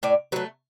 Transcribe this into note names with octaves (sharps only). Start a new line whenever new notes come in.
A2 D5
F#3 A3 B4